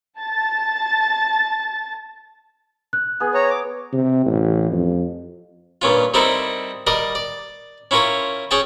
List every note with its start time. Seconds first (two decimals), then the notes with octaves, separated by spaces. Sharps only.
0.20 A5 A6
2.93 F#6
3.20 B3 G#4
3.34 C#5 A#5
3.50 D6
3.93 C3
4.26 A1
4.72 F2
5.82 G2 A#2 C#4 F4
6.14 G3 C4 D#4 E4 A4 A#4
6.87 G3 A#4 D5 D#5
7.15 D5
7.91 C#4 E4 F4 A#4 C#5
8.51 C#4 G#4 G5 A5